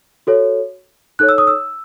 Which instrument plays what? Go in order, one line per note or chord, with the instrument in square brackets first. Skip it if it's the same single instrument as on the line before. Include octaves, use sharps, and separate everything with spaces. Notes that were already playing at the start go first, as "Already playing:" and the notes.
[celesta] F#4 A4 C#5
D#4 A4 C#5 F#6
E6
D#6
E6